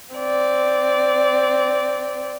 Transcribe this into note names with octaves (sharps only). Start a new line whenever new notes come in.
C4 D5